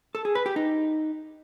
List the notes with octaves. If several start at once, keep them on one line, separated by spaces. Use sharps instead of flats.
A4
G#4
B4
G4
D#4